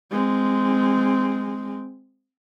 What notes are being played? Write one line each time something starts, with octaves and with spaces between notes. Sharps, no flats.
G#3 C4